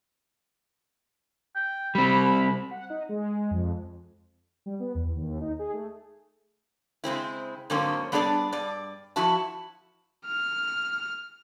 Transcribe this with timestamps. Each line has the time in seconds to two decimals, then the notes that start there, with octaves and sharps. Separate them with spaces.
1.56 G5
1.95 G3 C4 B5
2.71 F#5
2.90 D#4
3.09 G#3
3.51 F2
4.66 G3
4.80 B3
4.95 E2
5.16 D#2
5.41 D#4
5.59 G#4
5.73 A3
7.04 C#3 G#3 C4 E4
7.70 G#2 D3 F#3 A#3 C4 C#4
8.12 G3 B3 D4 G#4 C#5 D5
8.52 G2 D5
9.16 F3 E4 F#4 E5 A5
10.26 F6